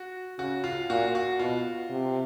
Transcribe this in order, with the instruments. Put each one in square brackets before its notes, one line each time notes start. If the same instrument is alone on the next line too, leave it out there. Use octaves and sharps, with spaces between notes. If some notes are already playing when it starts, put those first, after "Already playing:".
Already playing: [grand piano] F#4
[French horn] C#3 [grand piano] F#4
[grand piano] F4
[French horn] A#2 [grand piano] F#4
[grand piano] F#4
[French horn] B2 [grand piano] F4
[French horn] C3